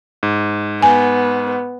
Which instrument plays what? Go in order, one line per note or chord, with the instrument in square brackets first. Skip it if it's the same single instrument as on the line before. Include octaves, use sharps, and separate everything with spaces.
[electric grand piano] G#2
[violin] B3 [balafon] G#5